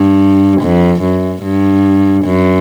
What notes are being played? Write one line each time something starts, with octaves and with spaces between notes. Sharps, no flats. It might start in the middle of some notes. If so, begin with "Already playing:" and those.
Already playing: G2
F2
F#2
G2
F#2